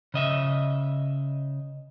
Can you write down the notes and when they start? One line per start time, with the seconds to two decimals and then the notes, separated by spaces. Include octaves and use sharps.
0.14 C#3 D#5 E5